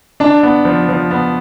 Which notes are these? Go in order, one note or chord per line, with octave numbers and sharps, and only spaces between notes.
D4 A5
B3
F3
F3
B3